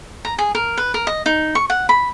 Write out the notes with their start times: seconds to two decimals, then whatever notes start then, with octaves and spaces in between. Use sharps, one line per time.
0.25 A#5
0.38 G#4
0.55 A#4
0.78 B4
0.94 A#4
1.07 D#5
1.26 D#4
1.55 C#6
1.70 F#5
1.89 B5